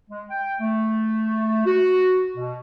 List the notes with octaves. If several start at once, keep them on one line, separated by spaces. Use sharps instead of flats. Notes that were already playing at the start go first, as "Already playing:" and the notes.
G#3
G5
A3
F#4
B2